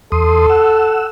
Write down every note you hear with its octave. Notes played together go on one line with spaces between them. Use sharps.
E2 A4 C6 D#6
F#5 E6